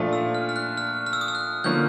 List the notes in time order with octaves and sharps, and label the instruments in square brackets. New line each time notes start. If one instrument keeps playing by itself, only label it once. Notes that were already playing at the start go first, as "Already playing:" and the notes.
Already playing: [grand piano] A#2 F3 A3 D4 F4
[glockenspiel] E6
F6
F6
F#6
F6
F6
E6
D#6
E6
F#6
[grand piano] D3 F3 A#3 C#4 [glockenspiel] G6